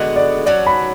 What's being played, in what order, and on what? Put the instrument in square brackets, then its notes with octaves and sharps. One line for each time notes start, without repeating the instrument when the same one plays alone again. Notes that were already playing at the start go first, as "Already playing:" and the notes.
Already playing: [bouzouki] D3 G#3 B3 F#4 [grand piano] D5
[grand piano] D5
[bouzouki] F#3 C#4 F#4 [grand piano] D5
[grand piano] B5